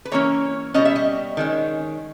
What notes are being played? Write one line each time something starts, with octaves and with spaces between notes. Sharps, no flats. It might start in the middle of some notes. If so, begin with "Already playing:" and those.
B4
E3 A#3 C#4 C#5
B2 G3 C#4 D#5
E5
D#5
D#3 G#3 C#4